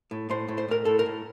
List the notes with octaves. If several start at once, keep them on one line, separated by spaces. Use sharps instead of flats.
A2
A2 C5
A2
C5
A2 A#4
A2 A4
A#4
A2